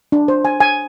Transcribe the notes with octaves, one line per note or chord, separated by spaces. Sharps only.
D4
C5
G#5
G#5